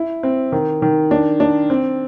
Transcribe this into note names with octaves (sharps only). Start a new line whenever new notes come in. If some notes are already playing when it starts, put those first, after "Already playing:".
Already playing: E4
C4
D#3
D#3
D4
D4
C4